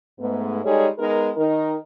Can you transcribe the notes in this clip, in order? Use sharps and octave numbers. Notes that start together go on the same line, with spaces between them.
G#2 A3 B3
G3 G#3 D#4 G#4 A4 C#5
G#3 B3 D#4 A#4
D#3 D#4 A#4